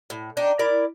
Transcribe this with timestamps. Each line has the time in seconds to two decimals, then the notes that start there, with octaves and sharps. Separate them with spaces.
0.10 A2
0.37 D4 D#4 G5
0.59 E4 A#4 D5